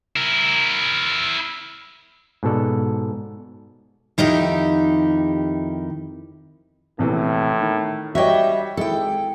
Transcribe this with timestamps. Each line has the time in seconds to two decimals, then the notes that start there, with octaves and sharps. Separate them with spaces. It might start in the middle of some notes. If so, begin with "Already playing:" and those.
0.16 E4 A#4
2.43 G#2 B2 A4 D5
4.18 F2 D#3 D#4 E4 G4
6.99 A#1 A2 C3 E3
7.61 D#3
8.15 G3 F#4 C#5 D#5 E5 G5
8.77 G#1 G#3 E4 A4 G5